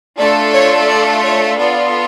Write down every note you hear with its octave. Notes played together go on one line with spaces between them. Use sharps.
A3 D4 F4 A4 D5
C#5
D5
C#5
B3 F4 A4 D5